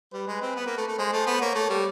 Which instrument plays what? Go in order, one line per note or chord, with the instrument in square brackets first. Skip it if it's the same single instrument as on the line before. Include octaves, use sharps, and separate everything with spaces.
[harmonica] G3 [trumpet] B4
[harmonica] G#3
C4
B3
A#3
A3
A3
[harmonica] G#3 [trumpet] C5
[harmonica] A3
B3
[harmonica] A#3 [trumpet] C#5
[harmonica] A3
G3